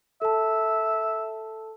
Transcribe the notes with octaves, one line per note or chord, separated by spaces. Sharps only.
A4 E5 A5